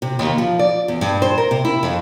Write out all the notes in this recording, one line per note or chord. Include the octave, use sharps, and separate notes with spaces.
C3
D#2
F3
D5
E2
G2
C5
A#4
C3
E4
F2